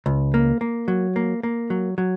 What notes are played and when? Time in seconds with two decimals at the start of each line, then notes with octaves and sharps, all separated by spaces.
0.06 C#2
0.34 A#3
0.61 A#3
0.88 F#3
1.16 A#3
1.43 A#3
1.70 F#3
1.98 F#3